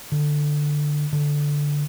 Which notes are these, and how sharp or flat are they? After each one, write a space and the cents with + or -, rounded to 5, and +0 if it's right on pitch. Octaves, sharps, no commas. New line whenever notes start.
D3 +10
D3 -5